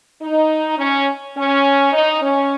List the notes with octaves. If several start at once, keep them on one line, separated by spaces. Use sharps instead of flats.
D#4
C#4
C#4
D#4
C#4